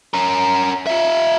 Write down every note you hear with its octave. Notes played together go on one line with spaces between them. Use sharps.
C#4 A#4
F4 E5